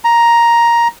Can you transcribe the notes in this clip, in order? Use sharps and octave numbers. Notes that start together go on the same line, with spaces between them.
A#5